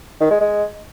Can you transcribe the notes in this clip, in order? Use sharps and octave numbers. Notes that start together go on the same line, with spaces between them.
D#3
G#3
G#3